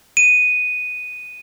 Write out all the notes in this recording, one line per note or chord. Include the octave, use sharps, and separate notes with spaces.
D#7